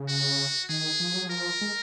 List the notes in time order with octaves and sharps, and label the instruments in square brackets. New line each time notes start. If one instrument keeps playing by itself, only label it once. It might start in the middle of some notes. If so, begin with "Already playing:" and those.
Already playing: [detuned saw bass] C#3
[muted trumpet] F#4
[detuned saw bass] D#3 [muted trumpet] G#4
[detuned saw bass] F3
F#3
[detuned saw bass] F3 [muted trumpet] A#4
[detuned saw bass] G#3